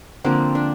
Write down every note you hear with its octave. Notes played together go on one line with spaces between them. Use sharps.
D3 F3 A#3 C4
D4